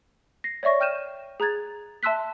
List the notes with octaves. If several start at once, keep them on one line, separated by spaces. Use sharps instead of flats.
A#6 C7
C#5 D5 E5 C#6 A#6
G5 F6 G6 D#7 E7
G#4 A#5 F#6 G#6 A6
E5 A5 C6 E6 F#6 B6